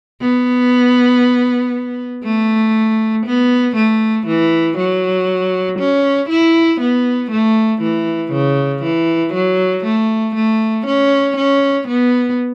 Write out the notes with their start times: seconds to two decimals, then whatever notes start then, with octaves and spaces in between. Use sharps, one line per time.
0.21 B3
2.24 A3
3.26 B3
3.76 A3
4.27 E3
4.77 F#3
5.79 C#4
6.30 E4
6.81 B3
7.31 A3
7.82 E3
8.33 C#3
8.83 E3
9.34 F#3
9.85 A3
10.35 A3
10.87 C#4
11.37 C#4
11.88 B3